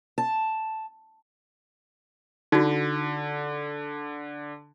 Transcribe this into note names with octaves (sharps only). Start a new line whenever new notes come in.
A5
D3 D#4 F#4